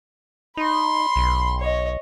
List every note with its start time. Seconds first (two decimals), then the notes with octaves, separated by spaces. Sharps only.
0.57 D#4 B5 C6
1.16 B1
1.60 C#5 D#5